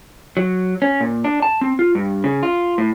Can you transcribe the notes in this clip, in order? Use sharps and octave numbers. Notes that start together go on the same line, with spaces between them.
F#3
C#4
A#2
D4
A5
C4
F4
G2
C#3
F4
A2